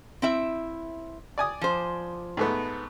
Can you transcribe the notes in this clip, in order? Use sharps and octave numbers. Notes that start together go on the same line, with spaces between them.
C4 E4 E5
D5 G#5 D#6
F3 C5
G#2 A3 B3